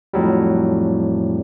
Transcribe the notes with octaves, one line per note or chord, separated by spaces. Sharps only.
F2 A2 F#3 G3